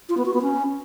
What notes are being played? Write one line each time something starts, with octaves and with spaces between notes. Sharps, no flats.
F4
B3
F#4
B3
C#4